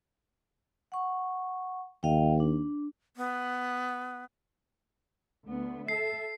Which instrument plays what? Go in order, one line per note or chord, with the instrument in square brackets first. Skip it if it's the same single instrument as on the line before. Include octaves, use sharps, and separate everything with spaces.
[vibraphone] F#5 C#6
[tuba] D#2 [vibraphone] D#5 F5 G5
[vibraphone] D4
[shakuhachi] B3
[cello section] D2 B3
[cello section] A4 E5 [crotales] C7